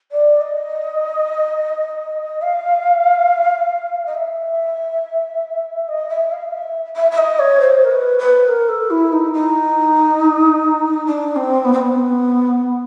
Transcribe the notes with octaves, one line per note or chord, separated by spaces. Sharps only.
D5
D#5
F5
D#5
E5
D#5
E5
F5
E5
E5
E5
D#5
C#5
C5
A#4
B4
B4
A#4
A4
E4
D#4
D#4
D4
C4
B3
C4
B3